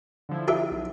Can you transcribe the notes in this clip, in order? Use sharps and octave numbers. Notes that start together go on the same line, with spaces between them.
D3 F3 E4
G4 A#4 E5
B1